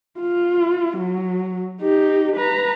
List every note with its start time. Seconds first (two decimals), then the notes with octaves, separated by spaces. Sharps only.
0.20 F4
0.98 F#3
1.82 D#4 G4
2.36 B4 A#5